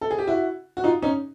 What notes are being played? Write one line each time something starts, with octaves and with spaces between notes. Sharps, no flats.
A4
G#4
G4
E4 F#4
F#4
D#4 F4
C#4 D#4